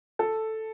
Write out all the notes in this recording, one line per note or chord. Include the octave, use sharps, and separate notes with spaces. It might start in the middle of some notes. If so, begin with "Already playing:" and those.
A4